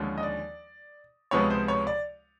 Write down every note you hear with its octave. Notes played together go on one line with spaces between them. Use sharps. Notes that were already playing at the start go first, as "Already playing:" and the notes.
Already playing: D#2 D3 F3 G#3 C#4
D#5
D5
C#2 C3 F3 G#3 B3 C#5
C5
C#5
D5